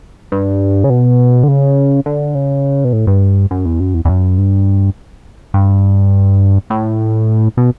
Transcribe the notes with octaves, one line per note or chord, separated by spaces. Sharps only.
G2
C#3
B2
D3
C#3
D3
C#3
B2
A2
G2
F#2
E2
F#2
E2
E2
F#2
G2
G2
A2
B2